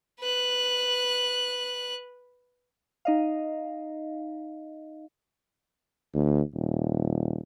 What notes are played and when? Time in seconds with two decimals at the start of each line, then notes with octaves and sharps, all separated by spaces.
0.20 B4 F#6
3.05 D#4 D#5 F5
6.14 D2
6.54 D#1